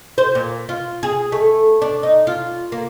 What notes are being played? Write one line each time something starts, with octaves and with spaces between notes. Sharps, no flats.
C5
A#2
F4
G#4
A3
D4
D#4
F4
A#3